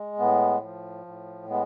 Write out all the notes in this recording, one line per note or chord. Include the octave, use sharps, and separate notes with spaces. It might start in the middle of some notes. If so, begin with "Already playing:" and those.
Already playing: G#3
A2 B3
F3
A2
G#3 B3